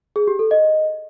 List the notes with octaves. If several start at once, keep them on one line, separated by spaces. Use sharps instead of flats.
G#4
G4
A4
D#5